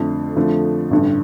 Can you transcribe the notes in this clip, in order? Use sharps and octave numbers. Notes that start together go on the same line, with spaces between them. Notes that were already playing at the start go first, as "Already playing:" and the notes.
Already playing: F2 D3 A3
F2 D3 F3 A3
A1 G2 D3